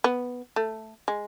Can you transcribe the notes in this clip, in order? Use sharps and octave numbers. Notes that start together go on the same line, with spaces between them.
B3
A3
G#3